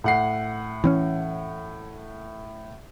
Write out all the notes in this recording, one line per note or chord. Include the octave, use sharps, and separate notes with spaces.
A2 F#5 C7
E3 C4 C#4